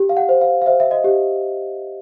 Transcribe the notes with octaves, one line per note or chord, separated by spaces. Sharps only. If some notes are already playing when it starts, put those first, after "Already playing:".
Already playing: G4
F5
F#5
C5
F5
F5
C5 E5
E5
D#5
G4